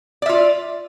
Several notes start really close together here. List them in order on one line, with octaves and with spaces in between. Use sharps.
D5 E5 F4